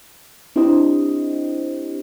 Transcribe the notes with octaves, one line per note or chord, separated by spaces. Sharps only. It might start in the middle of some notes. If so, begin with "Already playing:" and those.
C4 D4 E4 G4 C5 D#5